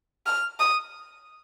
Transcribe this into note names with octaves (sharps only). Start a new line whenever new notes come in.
F6
D#6